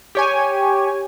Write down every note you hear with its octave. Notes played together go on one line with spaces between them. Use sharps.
G4 C#5 G#5